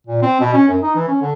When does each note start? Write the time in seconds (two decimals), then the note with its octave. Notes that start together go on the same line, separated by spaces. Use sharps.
0.07 A#2
0.22 C4
0.40 B2
0.53 C#4
0.68 F#2
0.82 D#4
0.95 E3
1.08 C#4
1.21 D3